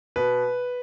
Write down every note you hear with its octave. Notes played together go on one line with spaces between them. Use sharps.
B2 B4